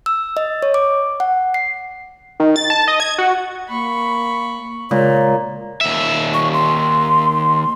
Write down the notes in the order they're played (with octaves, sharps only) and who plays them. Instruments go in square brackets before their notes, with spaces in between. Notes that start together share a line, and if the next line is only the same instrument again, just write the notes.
[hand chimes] E6
D#5
C#5
D6
F#5
C7
[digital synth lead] D#3
A6
A5
D#5
G#6
F#4
[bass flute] A#3 [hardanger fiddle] B5 C#6
[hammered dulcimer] A#2 [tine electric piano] C#3 G#3 [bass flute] C#5
[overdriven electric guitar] D#2 E5
[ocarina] C#6
C6